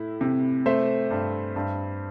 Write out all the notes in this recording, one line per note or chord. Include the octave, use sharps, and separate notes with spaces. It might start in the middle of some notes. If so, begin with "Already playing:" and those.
Already playing: A2 E4
C3
A3 C5 E5
G2
G2